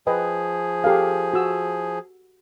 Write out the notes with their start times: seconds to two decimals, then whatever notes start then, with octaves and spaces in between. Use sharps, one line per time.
0.07 F3 G#4 B4 D#5 G5
0.84 G4 A4 F5
1.34 F#4 E6